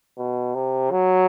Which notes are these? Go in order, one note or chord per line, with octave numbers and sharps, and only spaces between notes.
B2
C3
F#3